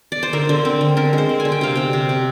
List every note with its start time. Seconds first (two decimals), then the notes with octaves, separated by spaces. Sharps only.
0.12 D5
0.23 C5
0.33 D3 A#4
0.49 D3
0.65 C4
0.81 D3
0.97 D3 A#4
1.13 G#3
1.18 C5
1.29 C4
1.40 G#5
1.45 D3
1.52 G5
1.61 C3 F5
1.75 C3 G5
1.93 C3
2.09 C3